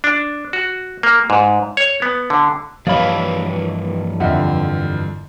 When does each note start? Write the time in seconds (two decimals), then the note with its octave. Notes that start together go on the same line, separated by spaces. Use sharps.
0.04 D4
0.53 F#4
1.03 A#3
1.30 G#2
1.77 C#5
2.02 B3
2.30 D3
2.87 G2 E3 F3 A#3 C#5 D#5 F5 B5
4.20 F2 D3 D#5 E5 F#5